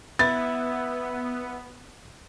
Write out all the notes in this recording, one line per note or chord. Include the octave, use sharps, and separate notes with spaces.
B3 E4 A6